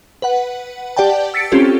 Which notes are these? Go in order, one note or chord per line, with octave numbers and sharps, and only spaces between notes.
B4 F#5
G4 D5 F#5 G5 A5
E6 A6 B6 C#7 D7
C4 C#4 F4 G4 A4